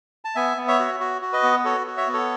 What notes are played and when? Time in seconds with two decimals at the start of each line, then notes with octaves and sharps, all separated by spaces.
0.25 A5
0.35 B3 E5 G#5
0.57 B3
0.68 C#5 E5
0.79 F#4
1.00 F#4
1.22 F#4
1.33 B4 D#5
1.43 B3
1.65 F#4 A4 C#5
1.87 F#4
1.97 C#5 E5
2.07 B3
2.13 A4 C#5